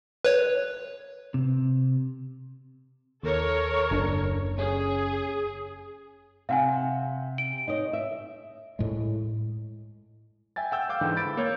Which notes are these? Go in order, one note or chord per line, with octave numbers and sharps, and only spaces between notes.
B4 C#5
C3
D#2 A4 A#4 C#5
F#1 D4
C#4 G#4
C3 F5 F#5 G#5
D7
D#4 C#5 D#5
E5
A2 G#3
E5 G5 G#5 A6
F#5 G5 E6 G6
F5 D6 G6
G#2 D3 E3
B5 A6 D7
A#3 C#5 G6